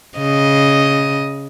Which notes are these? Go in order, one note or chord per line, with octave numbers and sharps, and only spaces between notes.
C#3 D#5